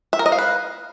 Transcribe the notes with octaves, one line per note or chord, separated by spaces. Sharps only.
E5
A#4
D#5
F5
B4